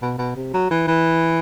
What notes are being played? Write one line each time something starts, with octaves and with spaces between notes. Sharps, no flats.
B2
B2
C3
F#3
E3
E3